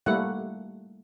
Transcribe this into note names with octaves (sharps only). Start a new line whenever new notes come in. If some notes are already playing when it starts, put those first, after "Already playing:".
G3 A3 A#3 E4 F#5